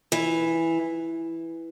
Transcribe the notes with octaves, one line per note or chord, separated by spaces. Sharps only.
E3